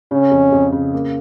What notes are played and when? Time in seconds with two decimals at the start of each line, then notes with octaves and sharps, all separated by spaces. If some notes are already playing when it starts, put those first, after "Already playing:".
0.11 C#3 C#4
0.31 F2
0.52 F2
0.72 C#3
0.94 A#3